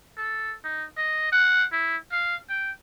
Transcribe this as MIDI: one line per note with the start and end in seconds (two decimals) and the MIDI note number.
0.17 0.55 69
0.64 0.85 63
0.97 1.32 75
1.32 1.65 78
1.72 1.97 64
2.12 2.36 77
2.49 2.71 79